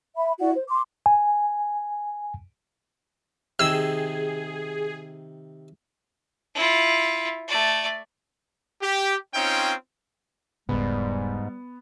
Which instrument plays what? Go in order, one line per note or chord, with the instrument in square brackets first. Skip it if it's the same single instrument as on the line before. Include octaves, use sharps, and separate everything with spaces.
[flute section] E5 B5
E4 F#4 D5 F#5
C5
C6 D6
[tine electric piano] G#5
[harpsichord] C3 D#3 [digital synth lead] G#4 [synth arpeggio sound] E6
[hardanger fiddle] E4 F4
A3 D5
[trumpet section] G4
C4 C#4 D#4 F4 C#5 G5
[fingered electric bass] E1 C#3 [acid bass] G#2 [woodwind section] G3 [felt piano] B3